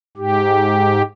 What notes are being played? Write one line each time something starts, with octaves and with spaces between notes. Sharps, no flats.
G#2 G4